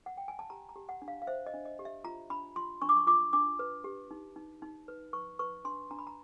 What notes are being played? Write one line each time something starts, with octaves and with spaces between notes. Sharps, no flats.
F#5
G5
G#5
A5
G4 A#5
A#5
G4
F#5
D4
F5
F5
C5 E5
D#5
D4
D#5
G4
E5
F4 A#5
D4 B5
F4 C6
D4 C#6
D6
C#6
F4 D6
D4 D6
B4
G4
D#4
D#4
D#4
B4
B4 C#6
B4 C#6
D4 C6
D4 A#5
B5
A#5